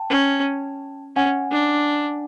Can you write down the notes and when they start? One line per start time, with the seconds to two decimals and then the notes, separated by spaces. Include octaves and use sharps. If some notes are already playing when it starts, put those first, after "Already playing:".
Already playing: G5 A5
0.10 C#4
1.16 C#4 F#5 G#5
1.51 D4